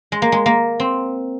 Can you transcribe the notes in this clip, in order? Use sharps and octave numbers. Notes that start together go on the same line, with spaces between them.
G#3
A#3
G#3
A#3
C4